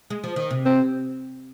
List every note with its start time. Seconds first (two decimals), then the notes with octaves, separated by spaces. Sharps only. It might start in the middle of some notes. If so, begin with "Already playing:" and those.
0.10 G#3
0.24 F3
0.36 D#3
0.51 C3
0.65 C4